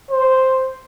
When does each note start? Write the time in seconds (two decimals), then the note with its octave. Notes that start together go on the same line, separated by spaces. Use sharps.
0.11 C5